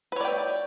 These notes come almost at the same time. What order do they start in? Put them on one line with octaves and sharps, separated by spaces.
B4 C#5 D5 G5